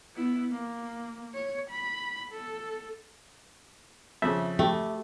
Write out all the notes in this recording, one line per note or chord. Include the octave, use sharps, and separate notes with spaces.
B3 E4
A#3
C#5
B5
A4
F2 C#3 E5
A3 G4